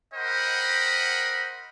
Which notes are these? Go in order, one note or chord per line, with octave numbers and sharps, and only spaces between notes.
A#4 C5 D#5 F#5 G5 B5